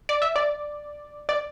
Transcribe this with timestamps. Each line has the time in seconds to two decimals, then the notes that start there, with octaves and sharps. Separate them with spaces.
0.09 D5
0.22 E5
0.36 D5
1.29 D5